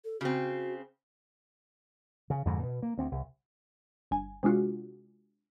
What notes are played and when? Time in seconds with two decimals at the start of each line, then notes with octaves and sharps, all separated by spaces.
0.05 A4
0.21 C#3 C4 F#4
2.30 C#3
2.45 F2 G#2 B2 D3
2.63 B2
2.82 A#3
2.97 D2 C4
3.12 C2
4.11 G1 G#5
4.43 C3 G#3 D4 F4 F#4